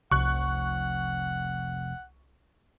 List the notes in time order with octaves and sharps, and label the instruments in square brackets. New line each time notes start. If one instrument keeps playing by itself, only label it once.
[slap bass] F1 F3 [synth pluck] C2 [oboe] F#5 [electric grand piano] C#6 F#6